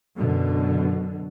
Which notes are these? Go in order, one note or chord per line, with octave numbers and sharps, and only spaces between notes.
F#2 B2 D3